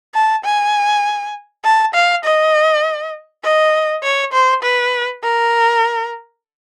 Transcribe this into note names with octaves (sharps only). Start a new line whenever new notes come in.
A5
G#5
A5
F5
D#5
D#5
C#5
C5
B4
A#4